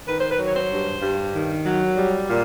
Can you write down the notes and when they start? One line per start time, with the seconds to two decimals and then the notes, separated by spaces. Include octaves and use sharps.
0.07 D#3 B4
0.20 C5
0.31 B4
0.39 F#3
0.46 C#5
0.55 C5
0.71 G2
1.02 G2
1.34 D#3
1.66 F#3
1.97 G3
2.28 A#2